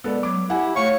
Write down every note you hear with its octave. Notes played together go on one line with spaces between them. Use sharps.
G#3 B3 A4 D5
F#3 D6
E4 G4 F#5 G#5
A3 C#5 F5 C#6